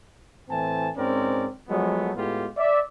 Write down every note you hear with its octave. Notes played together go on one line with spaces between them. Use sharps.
A2 E3 C4 G#5 A5
G#2 C4 C#4 A#4 D5
F3 F#3 G#3 A3 B3
A2 G#3 B3 F4 G4
D5 E5